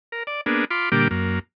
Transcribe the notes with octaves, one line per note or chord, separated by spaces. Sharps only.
A#4
D5
A#3 B3 D4 G#4
F4 B5 C6 D6
A#2 D3 G3 A#3 G4 D6
F#2 A#3